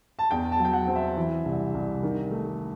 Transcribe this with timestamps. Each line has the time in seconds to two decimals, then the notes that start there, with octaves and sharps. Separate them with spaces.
0.19 A5
0.31 E2 G5
0.52 A5
0.59 F#3
0.65 G5
0.73 F#5
0.88 C4
0.95 E5
1.17 E3
1.45 C2
1.74 C2
2.03 D#3
2.31 A3